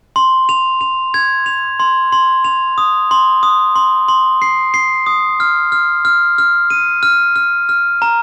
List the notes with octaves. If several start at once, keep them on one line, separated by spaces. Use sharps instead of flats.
C6
F7
F7
G#6
F7
C6
C6
F7
D#6
C6
D#6
C6
C6
C7
C7
D#6
F6
F6
F6
F6
D#7
F6
F6
F6
A#5